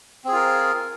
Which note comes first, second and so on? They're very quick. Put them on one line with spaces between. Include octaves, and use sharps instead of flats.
C4 G#4 F4 A#4